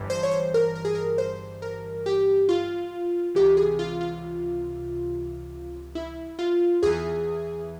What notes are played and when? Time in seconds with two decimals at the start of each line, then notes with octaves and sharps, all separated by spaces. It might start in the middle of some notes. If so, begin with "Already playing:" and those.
Already playing: G1 G2 E3
0.10 C5
0.23 C#5
0.31 C5
0.54 A#4
0.75 A#4
0.85 G#4
0.95 A#4
1.18 C5
1.62 A#4
2.06 G4
2.49 F4
3.35 C#2 C3 E3 G4
3.57 G#4
3.79 F4
4.01 F4
5.95 E4
6.39 F4
6.83 E2 E3 G#4